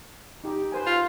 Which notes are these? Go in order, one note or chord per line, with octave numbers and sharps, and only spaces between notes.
D#4 G4
B4 C5 G#5
F4